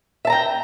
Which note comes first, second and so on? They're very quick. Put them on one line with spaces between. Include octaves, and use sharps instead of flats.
E5 A5 A#5 G5